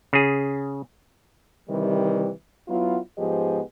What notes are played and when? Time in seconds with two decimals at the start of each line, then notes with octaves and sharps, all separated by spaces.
0.13 C#3 G#4
1.69 C3 D#3 E3 G3
2.68 F#3 B3 E4 F4
3.18 G#2 F3 B3 G4 G#4 D#5